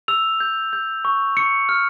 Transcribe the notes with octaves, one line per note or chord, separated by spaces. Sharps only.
E6 F7
G6
G6
C#6
C#6 C#7
F6